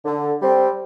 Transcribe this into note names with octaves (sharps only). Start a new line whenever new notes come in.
D3
G3 C4